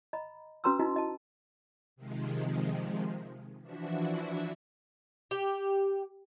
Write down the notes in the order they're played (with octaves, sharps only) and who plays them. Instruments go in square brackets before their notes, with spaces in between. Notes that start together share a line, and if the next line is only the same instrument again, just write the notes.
[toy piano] D#5 A#5 B5
C#4 F#4 B4 A#5 C6 E6
D#4 E4 F#4 D#5 A#5 C6
D#5 A5
[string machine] C3 D#3 F3 G#3
E3 F3 D4 E4 F#4 E5
[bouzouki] G4